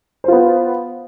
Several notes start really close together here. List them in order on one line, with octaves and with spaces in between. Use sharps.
C5 F4 B3